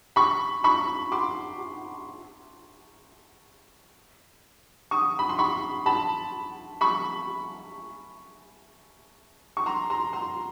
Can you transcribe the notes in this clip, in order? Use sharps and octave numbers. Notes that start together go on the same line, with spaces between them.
B5 C#6
B5 C#6
C6 D6
C#6 D#6
B5
C6
B5 C#6
A5 B5
B5 C#6
C#6
A#5 C6
A#5 C6
A#5 C6